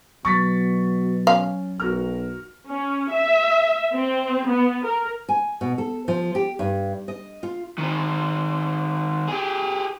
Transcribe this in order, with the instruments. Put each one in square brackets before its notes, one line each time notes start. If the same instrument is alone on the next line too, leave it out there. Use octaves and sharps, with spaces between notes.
[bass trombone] B2 [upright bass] F#3 [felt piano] C#6 A6 B6
[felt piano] C#4 [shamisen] F5
[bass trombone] B1 [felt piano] F#4 A#4 F6
[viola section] C#4
E5
C4
B3
A#4
[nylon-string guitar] G#5
B2
A4
F3
G4
G2
D#5
F4
[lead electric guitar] D#3 C4
G4 G#4